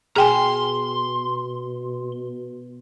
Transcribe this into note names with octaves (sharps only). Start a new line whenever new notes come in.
B2 G#4 G5 G#5 A#5 C6